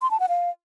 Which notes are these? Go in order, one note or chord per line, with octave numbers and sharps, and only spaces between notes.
C6
A5
F#5
F5